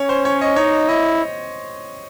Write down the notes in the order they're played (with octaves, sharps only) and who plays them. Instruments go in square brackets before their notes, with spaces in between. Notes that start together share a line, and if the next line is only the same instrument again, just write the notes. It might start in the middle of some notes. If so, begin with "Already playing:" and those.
Already playing: [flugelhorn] C#4 [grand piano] C#5
[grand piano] C5
C#5
D#5
[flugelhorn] D#4 [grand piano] C#5
[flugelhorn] E4 [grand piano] D#5